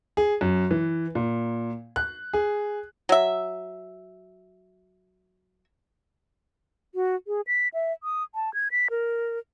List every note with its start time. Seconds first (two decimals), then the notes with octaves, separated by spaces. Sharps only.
0.17 G#4
0.41 F#2
0.71 E3
1.15 A#2
1.96 F#6
2.33 G#4
3.09 F#3 E5
6.95 F#4
7.27 G#4
7.47 B6
7.74 E5
8.03 D#6
8.35 A5
8.54 G#6
8.71 B6
8.90 A#4